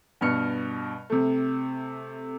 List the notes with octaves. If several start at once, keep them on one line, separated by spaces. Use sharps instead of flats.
G2 B2 F6 C#7
C3 A3